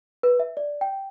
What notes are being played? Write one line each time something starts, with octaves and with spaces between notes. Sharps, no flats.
B4
E5
D5
G5